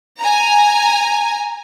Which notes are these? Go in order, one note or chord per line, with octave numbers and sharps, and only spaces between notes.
G#5 A#5